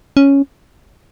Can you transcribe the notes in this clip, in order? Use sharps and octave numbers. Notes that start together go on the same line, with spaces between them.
C#4